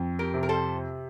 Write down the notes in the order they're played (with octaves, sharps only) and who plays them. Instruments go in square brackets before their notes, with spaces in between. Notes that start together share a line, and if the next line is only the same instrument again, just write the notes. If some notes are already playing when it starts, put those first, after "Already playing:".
Already playing: [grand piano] F2
[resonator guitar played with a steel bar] G4 A#4
[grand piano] C3
[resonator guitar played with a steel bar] A#4
A4 C5